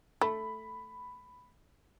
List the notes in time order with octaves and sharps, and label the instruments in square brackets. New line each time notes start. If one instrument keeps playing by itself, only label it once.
[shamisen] A3 [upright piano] B5